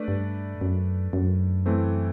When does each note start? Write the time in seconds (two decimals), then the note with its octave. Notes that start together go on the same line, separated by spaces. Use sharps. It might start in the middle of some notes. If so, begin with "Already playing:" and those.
Already playing: A3 D4 B4 D5
0.08 G2
0.61 F#2
1.13 F#2
1.66 E3 A3 C4